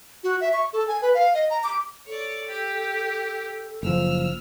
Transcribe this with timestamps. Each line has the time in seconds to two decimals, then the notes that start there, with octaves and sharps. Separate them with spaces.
0.24 F#4
0.41 E5
0.53 C#6
0.73 A4
0.88 G#5
1.02 B4
1.14 F5
1.34 D#5
1.50 A#5
1.64 D6
2.07 A4 C#5 D5
2.48 G4
3.83 F#1 F3 E6 F6